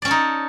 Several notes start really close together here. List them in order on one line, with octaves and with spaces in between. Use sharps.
D5 C#4 A4 D#4